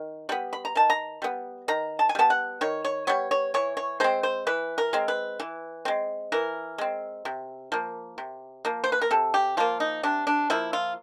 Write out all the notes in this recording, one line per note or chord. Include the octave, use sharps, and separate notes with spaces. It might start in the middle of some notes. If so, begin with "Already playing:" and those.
Already playing: D#3
G3 B3 B5
B5
A#5
D#3 A5
A#5
G3 B3
D#3 A#5
A5
G#5
G3 B3 A5
F#5
D#3 C#5
C#5
G3 B3 C#5
C#5
E3 C#5
C#5
G#3 C4 C5
C5
E3 B4
A#4
G#3 C4
B4
E3
G#3 C4
E3 A#4
G#3 C4
C3
F3 A#3
C3
F3 A#3
C5
B4
A#4
C3 A4
G4
F3 A#3 F4
D#4
C3 D4
D4
F3 A#3 E4
F4